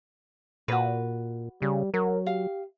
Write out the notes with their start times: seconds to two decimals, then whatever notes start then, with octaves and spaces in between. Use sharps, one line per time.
0.68 A#2 F#4 B4
1.62 C#3 G3
1.94 F#3 A#4
2.26 G4 F5